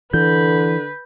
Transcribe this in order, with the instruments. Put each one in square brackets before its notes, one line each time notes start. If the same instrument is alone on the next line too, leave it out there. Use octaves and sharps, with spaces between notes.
[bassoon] D3 [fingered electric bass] E3 [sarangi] B4 [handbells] G6